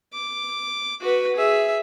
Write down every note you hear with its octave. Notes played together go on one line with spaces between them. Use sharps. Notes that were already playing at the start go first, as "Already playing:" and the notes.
D6
F#4 B4
G#4 E5